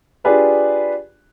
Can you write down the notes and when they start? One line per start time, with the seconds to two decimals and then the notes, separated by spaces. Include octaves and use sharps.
0.24 D4 F4 G4 G#4 B4 D5